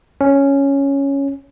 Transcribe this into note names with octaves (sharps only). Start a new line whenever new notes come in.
C#4